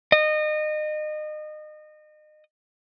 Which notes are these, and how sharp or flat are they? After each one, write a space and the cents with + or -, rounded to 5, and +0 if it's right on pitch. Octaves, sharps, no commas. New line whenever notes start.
D#5 -30